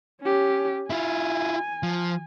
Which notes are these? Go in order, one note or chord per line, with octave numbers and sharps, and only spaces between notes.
C#4 G4
E4 F4 G#5
F3